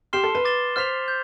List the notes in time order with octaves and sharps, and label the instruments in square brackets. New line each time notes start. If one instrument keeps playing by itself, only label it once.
[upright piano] G4 [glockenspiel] C6 F6 C7 E7 G7
[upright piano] A4
B4
[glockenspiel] D6 A6 E7 G7
[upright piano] C5 [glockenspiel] F6 B6 F7
[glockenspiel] G6